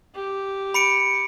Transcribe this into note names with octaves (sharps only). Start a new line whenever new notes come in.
G4
B5 C#7 D7